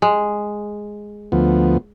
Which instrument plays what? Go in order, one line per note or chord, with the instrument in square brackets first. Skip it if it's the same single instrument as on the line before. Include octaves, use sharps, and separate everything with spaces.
[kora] G#3
[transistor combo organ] D2 F3 B3